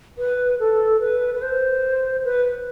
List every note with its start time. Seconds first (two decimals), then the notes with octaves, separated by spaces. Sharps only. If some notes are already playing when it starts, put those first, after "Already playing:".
0.18 B4
0.60 A4
1.01 B4
1.35 B4
1.42 C5
2.25 B4